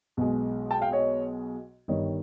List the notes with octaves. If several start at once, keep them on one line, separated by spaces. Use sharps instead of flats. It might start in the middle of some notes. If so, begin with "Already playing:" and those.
B1 B2 G#3
G5 A5
F5 G5
C#5 D#5
G1 G2 D#3 G3 C#5 D#5